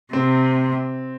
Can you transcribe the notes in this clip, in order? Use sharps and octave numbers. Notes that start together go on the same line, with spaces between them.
C3 C4